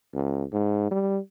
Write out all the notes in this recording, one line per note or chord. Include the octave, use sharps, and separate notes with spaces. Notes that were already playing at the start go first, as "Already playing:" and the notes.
C#2
G#2
G3